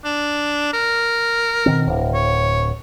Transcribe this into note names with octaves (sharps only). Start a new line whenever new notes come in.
D4
A#4
B2 D#3 C4
D1
C#5